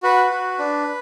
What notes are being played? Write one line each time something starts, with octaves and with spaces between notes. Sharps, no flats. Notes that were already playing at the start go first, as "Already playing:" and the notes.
F#4 B4
F#4
D4